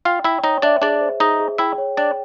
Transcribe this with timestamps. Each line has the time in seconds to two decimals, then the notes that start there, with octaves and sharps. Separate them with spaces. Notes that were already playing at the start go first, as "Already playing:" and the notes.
0.05 F4 F5 G5
0.24 E4 E5 G5
0.44 D#4 C#5 D#5
0.62 D4 D5 E5
0.82 D4 G#4 D5
1.01 C5
1.20 D#4 G#4 D#5
1.40 G#4
1.58 E4 E5 G5
1.78 C#5
1.97 D4 D5 G5